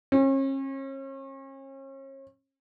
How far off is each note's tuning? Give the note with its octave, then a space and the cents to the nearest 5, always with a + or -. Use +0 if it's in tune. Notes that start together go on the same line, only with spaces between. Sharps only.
C#4 -40